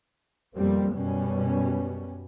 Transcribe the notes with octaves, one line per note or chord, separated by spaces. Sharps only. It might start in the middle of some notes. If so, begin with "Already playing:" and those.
F2 B2 G3 A#3 C4
F#2 B2 G3 B3 C#4